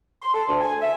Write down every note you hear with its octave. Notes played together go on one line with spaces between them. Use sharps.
C6
A4
D2
G#5
E5